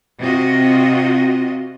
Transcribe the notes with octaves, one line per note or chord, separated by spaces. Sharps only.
C3 F4 F#4 D#5